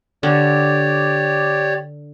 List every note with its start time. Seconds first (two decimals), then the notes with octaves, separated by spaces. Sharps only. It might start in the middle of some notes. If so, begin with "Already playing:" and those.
0.23 D3 G4 C#5 D5